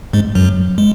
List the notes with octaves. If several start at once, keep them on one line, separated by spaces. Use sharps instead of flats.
G#2 G#3
F#2 F#3
G#3